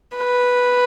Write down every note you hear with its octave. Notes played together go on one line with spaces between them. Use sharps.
B4